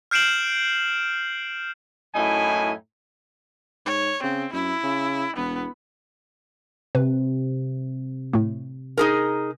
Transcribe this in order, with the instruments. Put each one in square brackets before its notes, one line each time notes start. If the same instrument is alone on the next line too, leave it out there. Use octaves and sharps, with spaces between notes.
[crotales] F6 G6 C7 D7 E7 F#7
[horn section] F#2 A2 D#4 E4 G#5
[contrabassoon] G#2 [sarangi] C#5
[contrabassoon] C#3 [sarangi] C4
[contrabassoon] F#2 [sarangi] E4
[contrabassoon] C#3
[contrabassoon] E1 [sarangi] B3
[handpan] C3 [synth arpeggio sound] B4
[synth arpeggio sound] A2 A3
[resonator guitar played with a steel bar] D#4 G#4 A#4